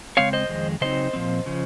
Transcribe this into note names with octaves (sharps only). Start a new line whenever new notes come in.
C#3 G#3 C4 C#5 F5
C5 D#5
F2 D#3 G#3
C#3 F#3 C4 D#4 C5 D#5
A#2 F3 C4
C#3 F3